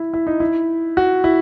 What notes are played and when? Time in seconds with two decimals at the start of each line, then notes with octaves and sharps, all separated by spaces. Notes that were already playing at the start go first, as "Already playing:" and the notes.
Already playing: E4
0.14 E4
0.27 D#4
0.40 E4
0.97 F#4
1.24 E4